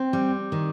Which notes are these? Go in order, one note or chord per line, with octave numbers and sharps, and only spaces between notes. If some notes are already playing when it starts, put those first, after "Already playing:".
Already playing: C4
G3
D#3